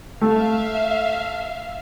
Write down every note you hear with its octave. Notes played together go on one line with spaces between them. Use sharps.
A3 E5 F5